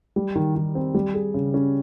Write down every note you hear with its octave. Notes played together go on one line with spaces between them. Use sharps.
G3
D#3
D#3
C4
G3
G#4
C#3
C#4